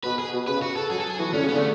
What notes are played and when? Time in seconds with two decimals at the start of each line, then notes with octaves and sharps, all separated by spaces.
0.04 B2 B4
0.19 G#4
0.34 B2
0.48 C#3 B4
0.62 F#4
0.76 A4
0.90 F#3 G#4
1.00 A4
1.10 G#4
1.19 E3 F#4
1.33 D3 C#4
1.44 C#3 B3
1.54 D3 A3